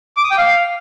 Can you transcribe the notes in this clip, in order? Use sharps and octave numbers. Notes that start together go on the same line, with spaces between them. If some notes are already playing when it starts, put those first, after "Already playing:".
D6
D#6
G5
F5